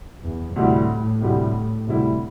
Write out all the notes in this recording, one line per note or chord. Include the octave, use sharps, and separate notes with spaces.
E2
D2 A2 C3 G3 E4 G4
D2 C3 G3 E4 G4
D2 C3 G3 E4 G4